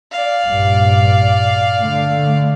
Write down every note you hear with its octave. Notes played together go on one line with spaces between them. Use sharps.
D5 F5
A#1 G2
D3 A3